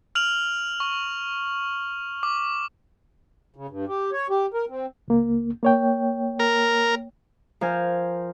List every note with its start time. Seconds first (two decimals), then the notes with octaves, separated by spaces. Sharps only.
0.15 F6 F7 F#7
0.80 C#6
2.23 D6
3.56 C#3
3.69 G2
3.88 G4
4.13 C#5
4.30 G4
4.54 A#4
4.69 C4
5.08 C#2 A#3
5.63 A#3 C#5 G5
6.39 A#4
7.61 F3 A#4 C5 G#5 F6